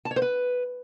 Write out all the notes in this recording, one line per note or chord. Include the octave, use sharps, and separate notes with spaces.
A5
C#5
C5
B4